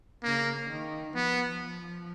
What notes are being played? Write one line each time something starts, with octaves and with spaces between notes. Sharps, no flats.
C#3 A#3
D#3
F3 B3